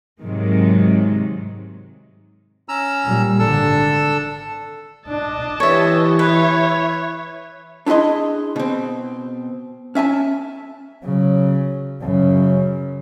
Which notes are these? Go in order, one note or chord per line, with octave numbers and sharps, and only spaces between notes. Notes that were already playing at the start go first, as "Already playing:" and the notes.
G#2 C3 D#3 F#3 G#3
C#4 A#5 E6
A#2 G3
G#1 D3 D4 A4 E6
D4 D#5 A5
E3 G4 B4 C#5 E5
B4 C#5 E5
D4 E4 G#4 D#5 C6
B2 C4
C#4 E5 G#5 A5
C#3 F#3
F#2 C#3